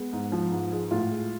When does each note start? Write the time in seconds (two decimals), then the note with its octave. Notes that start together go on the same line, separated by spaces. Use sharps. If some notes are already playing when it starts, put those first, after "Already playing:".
Already playing: G#3 B3
0.13 G#2
0.32 F3
0.52 G#2
0.72 G#3
0.91 A2 F4
1.11 G#3